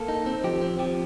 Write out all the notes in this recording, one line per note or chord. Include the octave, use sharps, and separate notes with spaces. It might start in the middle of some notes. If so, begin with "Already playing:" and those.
Already playing: A#3 A4
D#4
C4
F3 G4
C4
F3 G4